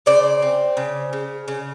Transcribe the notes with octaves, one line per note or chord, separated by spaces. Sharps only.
C#3 C5 D5
C4
C#3
C#3
C#3